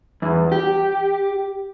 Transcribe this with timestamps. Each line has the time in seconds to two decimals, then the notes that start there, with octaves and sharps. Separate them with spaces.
0.22 E2
0.52 G4